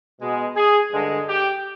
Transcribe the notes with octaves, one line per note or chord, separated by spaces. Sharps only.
B2 G#3
G#4
G2 D3 G#3
G4